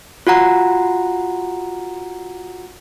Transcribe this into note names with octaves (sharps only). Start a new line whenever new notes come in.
F4 F#4 F#5 A#5